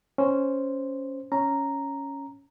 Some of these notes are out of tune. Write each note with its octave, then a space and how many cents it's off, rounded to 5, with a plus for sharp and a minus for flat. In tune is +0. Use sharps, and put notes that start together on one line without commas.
C#4 +0 C5 +0
C#4 +0 A#5 +0